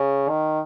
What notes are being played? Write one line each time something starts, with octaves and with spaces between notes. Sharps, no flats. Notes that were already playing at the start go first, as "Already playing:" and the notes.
Already playing: C#3
D#3